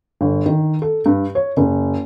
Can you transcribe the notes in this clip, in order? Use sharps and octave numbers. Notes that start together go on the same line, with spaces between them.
G1
D#3
A4
G2
C#5
F#1